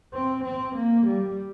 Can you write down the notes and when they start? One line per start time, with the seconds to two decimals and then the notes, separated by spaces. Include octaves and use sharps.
0.14 C4
0.44 C4
0.76 A#3
1.07 G3